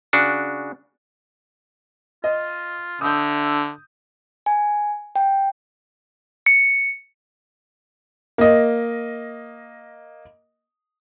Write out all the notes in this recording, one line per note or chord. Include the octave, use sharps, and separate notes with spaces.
C#3 D4 F#4
F4 D#5
D3 E5 D#6 G6
G#5
G5
C#7
A#3 D#5